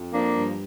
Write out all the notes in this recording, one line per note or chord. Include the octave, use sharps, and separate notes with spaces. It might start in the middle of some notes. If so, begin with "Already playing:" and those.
Already playing: F2
F3 A#3 D4
G2